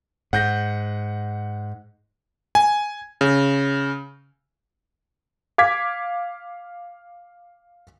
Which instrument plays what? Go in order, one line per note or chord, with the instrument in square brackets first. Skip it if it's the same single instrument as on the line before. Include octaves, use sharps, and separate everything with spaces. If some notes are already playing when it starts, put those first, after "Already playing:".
[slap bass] G#2 [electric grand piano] F#5 G6 A#6
[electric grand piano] G#5
C#3
F5 D6 G#6 B6